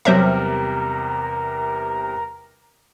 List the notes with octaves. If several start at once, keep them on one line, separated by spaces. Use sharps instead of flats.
E2 C3 F#3 G3 A#4 C5 E5